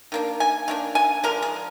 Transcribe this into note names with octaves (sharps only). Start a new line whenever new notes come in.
D#3 A#3 D4
G#5
D#3 A#3 D4
G#5
D3 F3 G#3 D4 A#4
G#4